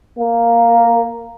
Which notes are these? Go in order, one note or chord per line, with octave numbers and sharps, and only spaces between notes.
A#3